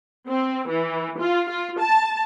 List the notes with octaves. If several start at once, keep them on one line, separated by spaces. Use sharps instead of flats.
C4
E3
F4
F4
A5